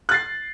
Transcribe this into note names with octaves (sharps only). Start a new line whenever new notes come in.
F#6 A6 C7